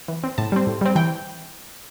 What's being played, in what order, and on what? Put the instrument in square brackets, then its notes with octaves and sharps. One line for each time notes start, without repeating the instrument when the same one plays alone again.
[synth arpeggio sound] E3
C4
A2 A5
G3 C4
A2
G3 C4
E3 G5